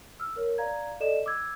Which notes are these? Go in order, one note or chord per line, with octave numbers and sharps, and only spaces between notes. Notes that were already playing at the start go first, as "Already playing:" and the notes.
E6 F6
A#4 C#5
D5 F5 A#5 G#6
A4 D5 D#5 E7
D6 E6 G#6